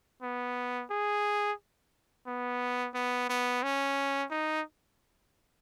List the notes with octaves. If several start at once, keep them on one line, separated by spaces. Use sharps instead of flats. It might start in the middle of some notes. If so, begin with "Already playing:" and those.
B3
G#4
B3
B3
B3
C#4
D#4